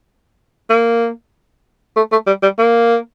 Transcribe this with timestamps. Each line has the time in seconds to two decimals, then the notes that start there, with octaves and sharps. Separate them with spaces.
0.70 A#3
1.96 A3
2.12 A3
2.27 G3
2.43 G3
2.58 A#3